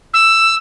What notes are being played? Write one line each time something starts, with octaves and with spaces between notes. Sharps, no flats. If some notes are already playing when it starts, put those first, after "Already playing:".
E6